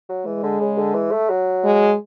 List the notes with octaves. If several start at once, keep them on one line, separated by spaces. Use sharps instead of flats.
F#3
E3 G#3
D3
C#3
D3
E3
A3
F#3
G#3